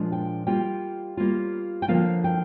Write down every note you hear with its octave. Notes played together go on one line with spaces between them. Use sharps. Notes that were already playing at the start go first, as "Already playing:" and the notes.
Already playing: A#2 F3 G#3 D4 F4
G5
G3 A#3 F4 G5
G3 A#3 F4
G5
D3 F3 A#3 F4 F5
G5